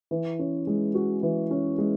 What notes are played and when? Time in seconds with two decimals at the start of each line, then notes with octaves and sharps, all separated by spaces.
0.11 E3
0.39 C#4
0.67 G#3
0.95 F#4
1.23 E3
1.51 C#4
1.78 G#3